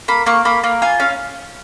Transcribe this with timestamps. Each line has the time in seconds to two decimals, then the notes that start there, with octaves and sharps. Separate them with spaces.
0.08 A#3 B5
0.26 A#3 C#6
0.45 A#3 B5
0.64 A#3
0.82 F4 G#5
1.00 C#4 F5